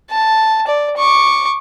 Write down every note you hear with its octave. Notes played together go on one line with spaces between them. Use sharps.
A5
D5
C#6 D6